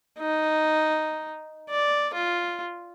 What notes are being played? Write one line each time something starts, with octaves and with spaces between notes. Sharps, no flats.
D#4
D5
F4